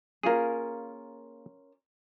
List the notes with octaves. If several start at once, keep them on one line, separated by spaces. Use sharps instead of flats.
A#3 C#4 F4 G#4 A#4